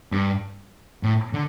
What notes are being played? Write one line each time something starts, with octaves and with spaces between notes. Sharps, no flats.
G2
A2
D3